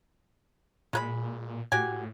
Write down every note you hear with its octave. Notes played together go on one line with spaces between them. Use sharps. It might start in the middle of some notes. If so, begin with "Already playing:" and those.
A#2 G#3 B4 B5
A2 F#4 G4 G#5